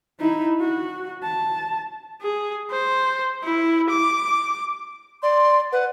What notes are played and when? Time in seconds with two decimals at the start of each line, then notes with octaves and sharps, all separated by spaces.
0.20 D#4 E4
0.60 F#4
1.24 A5
2.22 G#4
2.71 C5
3.43 E4
3.90 D6
5.23 D5 C6
5.72 B4 F#5